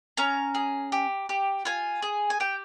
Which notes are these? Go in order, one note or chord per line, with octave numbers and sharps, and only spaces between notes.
C#4 A#5
G#4
G4
G4
F4 G#5
G#4
G#5
G4 G5